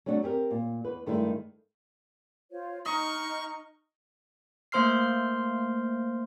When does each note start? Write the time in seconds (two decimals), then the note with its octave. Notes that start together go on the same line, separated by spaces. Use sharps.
0.06 F#3 A3 D4 F4 F#4
0.23 C4 G4 G#4 A#4
0.51 A#2
0.84 E2 B4
1.06 G2 D#3 G#3 A3 E4
2.51 F4 C5 C#5
2.86 D#4 D#5 A#5 C#6 F6
4.72 A3 A#3 C5 C6 F6 C7